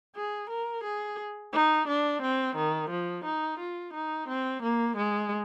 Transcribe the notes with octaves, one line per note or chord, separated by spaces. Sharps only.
G#4
A#4
G#4
D#4
D4
C4
D#3
F3
D#4
F4
D#4
C4
A#3
G#3